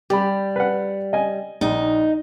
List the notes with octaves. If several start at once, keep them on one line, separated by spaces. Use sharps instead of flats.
G3 G4 B5
B4 F#5
D#5 G#5
A#1 D#4